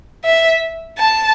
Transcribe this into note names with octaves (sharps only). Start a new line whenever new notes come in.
E5
A5